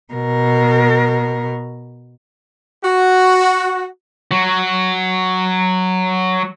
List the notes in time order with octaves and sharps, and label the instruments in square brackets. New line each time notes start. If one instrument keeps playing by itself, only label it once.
[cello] B2 A#4
[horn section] F#4
[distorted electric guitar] F#3 F#4